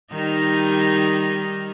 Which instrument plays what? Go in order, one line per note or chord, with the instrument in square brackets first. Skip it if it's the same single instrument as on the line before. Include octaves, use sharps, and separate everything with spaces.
[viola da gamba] D#3 G3 D#4